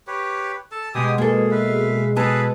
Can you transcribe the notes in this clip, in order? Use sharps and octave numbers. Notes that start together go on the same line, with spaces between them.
G4 B4 C#5
A4 A5
B2 G#3 G4 G#5 D#6
A#3 G#4 A4
B4 E5 F5
B3 G#4 A4 B4 A5